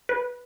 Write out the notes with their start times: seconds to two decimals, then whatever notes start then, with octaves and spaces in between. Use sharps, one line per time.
0.09 B4